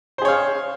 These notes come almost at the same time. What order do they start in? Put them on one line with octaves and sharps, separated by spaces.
C5 G#4 C#5 F5